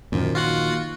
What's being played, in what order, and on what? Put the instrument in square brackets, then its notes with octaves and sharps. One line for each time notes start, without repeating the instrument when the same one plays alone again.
[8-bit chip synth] F#2 [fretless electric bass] A#2 D#3 F3
[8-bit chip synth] F4 F#4 F#5